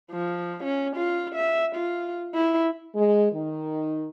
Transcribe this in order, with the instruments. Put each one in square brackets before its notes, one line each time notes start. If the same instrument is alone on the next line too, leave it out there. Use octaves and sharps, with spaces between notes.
[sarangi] F3
C#4
F4
E5
F4
E4
[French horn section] G#3
D#3